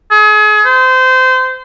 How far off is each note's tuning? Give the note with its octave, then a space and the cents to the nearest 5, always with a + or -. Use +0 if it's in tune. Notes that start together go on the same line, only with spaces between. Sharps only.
G#4 +35
C5 -25